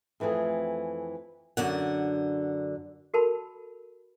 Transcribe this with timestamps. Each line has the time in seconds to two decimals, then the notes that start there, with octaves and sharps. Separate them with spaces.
0.20 F2 E3 A3 C4 G#4
1.57 F#2 D3 F#5
3.14 F#4 A4 A#4 A5 B5